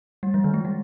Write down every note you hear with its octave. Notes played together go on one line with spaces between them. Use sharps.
G3
F3
D#3
G#3
G3